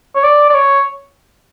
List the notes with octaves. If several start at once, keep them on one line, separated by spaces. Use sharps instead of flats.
C#5
D5
D5
C#5